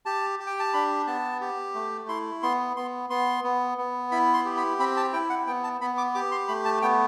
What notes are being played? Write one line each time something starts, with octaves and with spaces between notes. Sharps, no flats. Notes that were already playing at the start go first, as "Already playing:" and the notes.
G4 A5
G4
G5
A5
D4 B5
B3 A5
G4
A3
E4 C6
B3 C6
B3 C6
B3 C6
B3
B3
E4 B5
C6
G4
B5
C4 B5
A5
E4 G5
F#5
B3 G5
A5
B3 B5
D6
G4 D6
C6
A3 B5
A5
B3 G5